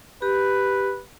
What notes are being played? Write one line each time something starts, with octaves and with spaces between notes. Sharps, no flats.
G4 B4